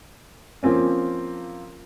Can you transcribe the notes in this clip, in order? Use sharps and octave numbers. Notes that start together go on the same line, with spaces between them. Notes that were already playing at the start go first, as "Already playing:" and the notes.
F3 A#3 C4 C#4